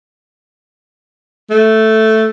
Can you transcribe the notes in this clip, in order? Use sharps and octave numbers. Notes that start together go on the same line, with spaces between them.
A3